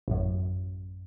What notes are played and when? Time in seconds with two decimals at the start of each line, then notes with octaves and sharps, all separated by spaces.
0.08 A1 F#2